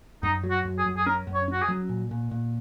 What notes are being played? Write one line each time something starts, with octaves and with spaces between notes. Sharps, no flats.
F#2 D#4
F#3
F#4
F#2
G#4
F#2
G#4
C#4 A#4
F#2
C#5
C#4 F#4
G#4
F#3
A#2
A#2
A#2